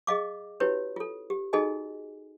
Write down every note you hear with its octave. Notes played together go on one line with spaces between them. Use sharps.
G#4 D#5 F5 D6
C#4 E4 F#4 G4 B4 C#5
F4 A4
G4
D#4 F#4 G#4 A4 D#5 G#5